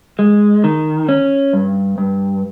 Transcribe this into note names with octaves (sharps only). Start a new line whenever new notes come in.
G#3
D#3
C#4
G2
G2